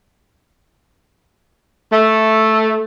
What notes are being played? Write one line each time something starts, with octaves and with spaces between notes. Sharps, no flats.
A3